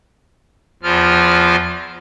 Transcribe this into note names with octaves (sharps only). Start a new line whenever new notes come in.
E2 F3 F4 F6